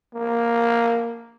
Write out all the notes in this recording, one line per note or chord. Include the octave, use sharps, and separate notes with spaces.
A#3